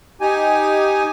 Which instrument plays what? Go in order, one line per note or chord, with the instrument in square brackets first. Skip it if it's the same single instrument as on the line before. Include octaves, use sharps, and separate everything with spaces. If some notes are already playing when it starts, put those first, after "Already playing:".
[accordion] D#4 G4 G#5